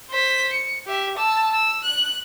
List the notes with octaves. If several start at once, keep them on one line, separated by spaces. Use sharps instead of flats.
C5 B6
C#7
G4 E5
A5 E6
E6
F#6